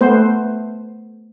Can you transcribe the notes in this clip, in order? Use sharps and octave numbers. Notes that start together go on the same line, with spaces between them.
A3 B3 C5